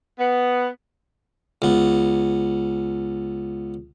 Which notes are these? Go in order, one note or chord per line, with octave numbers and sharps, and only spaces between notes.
B3
C#2 B3